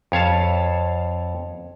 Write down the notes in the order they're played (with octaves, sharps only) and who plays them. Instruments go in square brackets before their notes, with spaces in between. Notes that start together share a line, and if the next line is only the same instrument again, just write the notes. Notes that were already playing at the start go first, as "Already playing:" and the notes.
[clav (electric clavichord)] F2 C#5 F5 A5